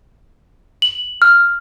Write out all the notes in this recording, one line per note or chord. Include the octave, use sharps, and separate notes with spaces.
F#7
F6